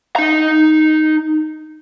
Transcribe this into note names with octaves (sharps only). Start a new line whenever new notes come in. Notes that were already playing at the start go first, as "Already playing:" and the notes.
D#4 A#5